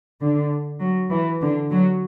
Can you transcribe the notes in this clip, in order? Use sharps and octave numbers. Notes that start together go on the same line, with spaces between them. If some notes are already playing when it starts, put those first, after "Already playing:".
D3
F#3
E3
D3
F#3